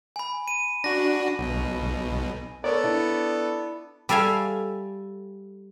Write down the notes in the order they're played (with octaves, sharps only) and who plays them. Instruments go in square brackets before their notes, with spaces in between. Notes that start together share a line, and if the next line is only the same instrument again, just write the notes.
[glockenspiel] G#5 B5
D#7
[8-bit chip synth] D4 F#4 [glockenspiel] A#6
[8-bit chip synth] B1 B2
[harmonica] B3 A4 [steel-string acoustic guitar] A#4 [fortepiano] C#5 D5
[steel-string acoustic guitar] D4 E4
[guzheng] G3 A4 E5 F5 G#5